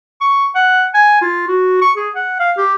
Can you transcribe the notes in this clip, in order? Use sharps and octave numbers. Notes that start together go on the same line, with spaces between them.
C#6
F#5
G#5
F4
F#4
C#6
G#4
F#5
F5
G4